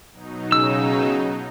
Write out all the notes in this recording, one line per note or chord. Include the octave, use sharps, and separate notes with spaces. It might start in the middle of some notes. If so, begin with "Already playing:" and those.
B2 F#3 D#4
C#3 E6